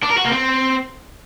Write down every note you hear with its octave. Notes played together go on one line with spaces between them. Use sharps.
D4
A#4
F#4
A#3
C4